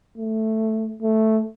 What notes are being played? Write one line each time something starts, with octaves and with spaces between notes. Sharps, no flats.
A3
A3